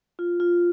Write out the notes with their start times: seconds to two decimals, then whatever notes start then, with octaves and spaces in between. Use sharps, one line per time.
0.19 F4
0.40 F4